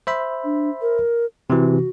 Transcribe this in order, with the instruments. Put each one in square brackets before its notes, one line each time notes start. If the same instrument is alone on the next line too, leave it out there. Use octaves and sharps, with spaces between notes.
[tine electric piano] C5 E5 B5
[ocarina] D4
A#4
[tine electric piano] C3 E3 [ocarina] F#4